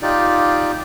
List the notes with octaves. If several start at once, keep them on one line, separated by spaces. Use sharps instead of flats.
D#4 F4 G4 D5